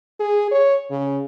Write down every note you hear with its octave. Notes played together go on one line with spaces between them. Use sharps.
G#4
C#5
C#3